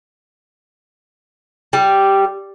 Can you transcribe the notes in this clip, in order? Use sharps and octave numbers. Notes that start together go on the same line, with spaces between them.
G3